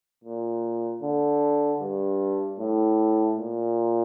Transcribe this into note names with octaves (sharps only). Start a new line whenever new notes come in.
A#2
D3
G2
A2
A#2